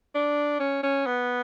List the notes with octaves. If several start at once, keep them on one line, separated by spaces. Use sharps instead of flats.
D4
C#4
C#4
B3